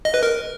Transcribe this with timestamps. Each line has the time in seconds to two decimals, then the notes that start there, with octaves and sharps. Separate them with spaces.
0.05 D#5
0.14 B4
0.23 A#4